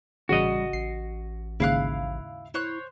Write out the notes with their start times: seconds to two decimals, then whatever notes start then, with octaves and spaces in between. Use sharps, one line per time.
0.29 A1 C#3 G3 F#4 D#5
0.73 A1 C7
1.60 A1 D#2 G#2 C#3 E4 F5 F#6
2.54 E4 C5 C#5 F#6